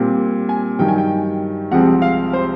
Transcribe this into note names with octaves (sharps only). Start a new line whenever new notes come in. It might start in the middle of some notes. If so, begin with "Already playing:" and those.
Already playing: A#2 G3 C4
G#5
G2 D#3 F#3 G5
G#5
G5
C2 C3 F3 G#3 C4 F#5
F5
C5